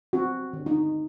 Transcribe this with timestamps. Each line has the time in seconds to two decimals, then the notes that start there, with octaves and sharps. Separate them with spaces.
0.13 C4 F#4
0.53 D3
0.66 D#4